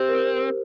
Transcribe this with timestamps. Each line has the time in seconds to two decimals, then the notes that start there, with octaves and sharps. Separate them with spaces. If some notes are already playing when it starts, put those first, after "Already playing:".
Already playing: C4 G4 C5
0.09 A#4